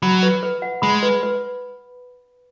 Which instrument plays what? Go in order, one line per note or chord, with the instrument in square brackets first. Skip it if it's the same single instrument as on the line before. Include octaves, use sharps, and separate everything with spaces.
[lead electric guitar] F#3 [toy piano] B5
[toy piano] B4
B4
F#5
[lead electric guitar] G#3 [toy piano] B5
[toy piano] B4
B4